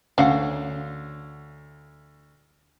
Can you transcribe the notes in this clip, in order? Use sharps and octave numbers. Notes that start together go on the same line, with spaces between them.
D2 C#4 F5 F#5